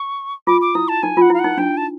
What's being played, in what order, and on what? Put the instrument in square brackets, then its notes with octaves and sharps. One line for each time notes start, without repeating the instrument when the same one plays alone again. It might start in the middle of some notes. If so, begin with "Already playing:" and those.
Already playing: [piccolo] C#6
[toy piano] F4 [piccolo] D6
[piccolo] D6
[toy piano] E4 [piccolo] D#6
[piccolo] A5
[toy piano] D#4 [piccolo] G#5
[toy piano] F4 [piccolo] F#5
[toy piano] E4 [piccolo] F5
[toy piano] D#4 [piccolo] F#5
[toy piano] D4 [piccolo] G5
[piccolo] A5